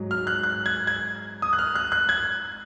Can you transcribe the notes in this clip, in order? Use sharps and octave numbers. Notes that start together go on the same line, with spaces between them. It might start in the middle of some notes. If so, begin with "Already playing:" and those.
Already playing: G#2 F#3
F6
F#6
F#6
G#6
G#6
D#6
F#6
F6
F#6
F#6
G#6